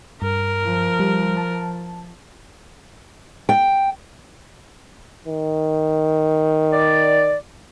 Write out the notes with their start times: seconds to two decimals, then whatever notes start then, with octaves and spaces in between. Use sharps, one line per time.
0.22 G2 A#4
0.63 F3
1.00 G3
1.37 A5
3.49 G5
5.28 D#3
6.72 D5